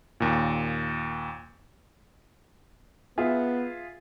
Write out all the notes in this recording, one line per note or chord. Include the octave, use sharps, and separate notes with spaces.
D#2 A#2
B3 F4 G#4 E5